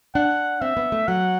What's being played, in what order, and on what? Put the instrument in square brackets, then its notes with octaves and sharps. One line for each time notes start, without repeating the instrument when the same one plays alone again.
[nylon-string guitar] D4 [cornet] F#5
[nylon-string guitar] C4 [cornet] E5
[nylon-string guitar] B3
A3
[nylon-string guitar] F#3 [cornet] F#5